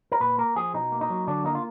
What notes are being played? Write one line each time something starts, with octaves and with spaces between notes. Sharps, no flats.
A#4
A#2 B4
A#3 A#4
F3 G#4
B2 D#4
A#3
D#4
F#3
D3 D4
A#3 D#4
F4